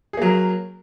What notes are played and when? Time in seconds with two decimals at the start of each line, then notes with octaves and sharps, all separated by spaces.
0.13 G#4
0.17 A#3
0.22 F#3
0.26 A#4